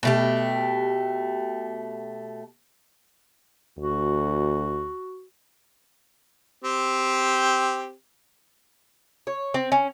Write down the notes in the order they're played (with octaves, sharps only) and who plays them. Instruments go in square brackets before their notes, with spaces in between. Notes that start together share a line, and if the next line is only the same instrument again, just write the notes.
[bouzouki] B2 A3 G4
[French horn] D2 [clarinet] F#4
[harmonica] C4 G4
[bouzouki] C#5
C4
C#4